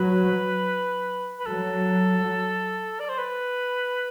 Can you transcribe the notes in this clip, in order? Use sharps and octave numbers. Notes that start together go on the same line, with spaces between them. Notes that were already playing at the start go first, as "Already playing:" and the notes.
Already playing: F#3 B4
B4
F#3 A4
D5
C5
B4